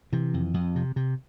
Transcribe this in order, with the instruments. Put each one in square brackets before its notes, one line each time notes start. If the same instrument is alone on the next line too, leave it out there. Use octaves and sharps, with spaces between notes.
[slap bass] C3 E3
F2
F2
C3
C3